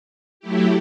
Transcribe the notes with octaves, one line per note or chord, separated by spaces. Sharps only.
F#3 A3 E4 G4